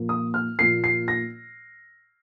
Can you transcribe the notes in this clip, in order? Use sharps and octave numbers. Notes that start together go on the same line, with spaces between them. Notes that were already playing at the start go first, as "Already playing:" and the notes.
Already playing: A#2 F3 A#3
D#6
F6
A#2 F3 A#3 C7
C7
A#6